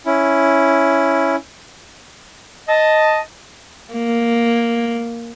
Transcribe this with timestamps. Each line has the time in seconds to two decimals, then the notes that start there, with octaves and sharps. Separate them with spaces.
0.06 C#4 E4
2.68 D#5 A5
3.93 A#3